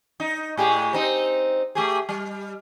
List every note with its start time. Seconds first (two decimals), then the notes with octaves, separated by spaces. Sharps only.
0.20 D#4
0.57 A2 G4 G#4
0.93 C4 D#4
1.75 A3 G4 G#4
2.09 G3